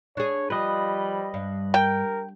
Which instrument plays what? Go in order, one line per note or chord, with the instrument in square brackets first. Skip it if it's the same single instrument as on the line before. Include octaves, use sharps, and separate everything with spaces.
[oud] D4 G#4 [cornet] C#5
[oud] F3 [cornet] G3 [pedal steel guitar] B4 D#5
[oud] G2
[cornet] A#4 [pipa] G5